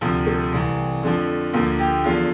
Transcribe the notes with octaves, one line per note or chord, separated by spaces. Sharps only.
D2 C3 F3
A3
C2 C3 E3
F2 D3 F3
D2 D3 F3 A#3
G4
E2 D3 F3 F4